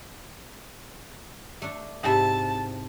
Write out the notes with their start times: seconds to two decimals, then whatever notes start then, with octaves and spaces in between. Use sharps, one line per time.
1.62 A3 D4
2.03 G#2 C3 E4 A5